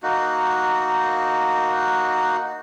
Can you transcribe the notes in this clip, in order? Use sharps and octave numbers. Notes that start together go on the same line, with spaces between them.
A#3 D#4 F#4